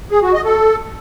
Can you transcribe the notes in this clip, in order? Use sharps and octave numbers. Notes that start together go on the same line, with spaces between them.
G#4
F#4
D#5
A4